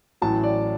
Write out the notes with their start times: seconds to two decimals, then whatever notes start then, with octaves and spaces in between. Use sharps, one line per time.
0.22 A1 A2 F#3 A5
0.43 D5